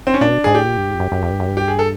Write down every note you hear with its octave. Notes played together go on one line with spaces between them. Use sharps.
C4
C#4
A#2 D4
B2
G#2 G#4
A2 G4
A#2
G2
G#2
F2
F#2
F#2
F2
G2
F#2
G2
G4
G#4
A4